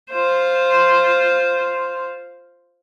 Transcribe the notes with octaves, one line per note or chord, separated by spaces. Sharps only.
F4 C5